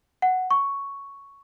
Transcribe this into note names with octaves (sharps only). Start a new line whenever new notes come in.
F#5
C#6